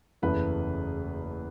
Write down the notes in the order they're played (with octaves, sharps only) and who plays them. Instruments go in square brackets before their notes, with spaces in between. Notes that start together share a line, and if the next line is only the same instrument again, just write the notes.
[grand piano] F#1 E2 C#3 E3 A3 B4